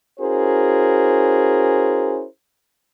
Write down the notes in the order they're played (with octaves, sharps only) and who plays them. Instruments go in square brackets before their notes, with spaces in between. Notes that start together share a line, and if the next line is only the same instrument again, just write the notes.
[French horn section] C#4 E4 F#4 G#4 A#4 C5